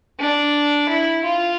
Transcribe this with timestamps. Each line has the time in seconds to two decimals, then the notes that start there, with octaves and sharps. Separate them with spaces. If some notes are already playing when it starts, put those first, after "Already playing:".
0.19 D4
0.89 E4
1.24 F4